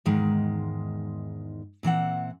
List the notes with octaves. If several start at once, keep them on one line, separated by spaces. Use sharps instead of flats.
E2 G#2 D#3 G#3
A#2 E3 C4 F#5